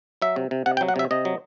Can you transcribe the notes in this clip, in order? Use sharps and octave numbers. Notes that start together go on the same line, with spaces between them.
F#3 E5
C3
C3
C3 F#5
G5
F#3
F#5
C3 E5
C3 D#5
F#3